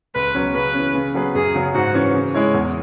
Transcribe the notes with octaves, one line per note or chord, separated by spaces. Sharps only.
C#2 B4
B2 F#3 C#4
C#3 B4
E3 C#4
C#3
F#3 B3 G#4 B4
F#2 G#4
C#3 F#3 C#4
G#2 F#4
E3 C#4
C#3
G#3 E4 C#5
E2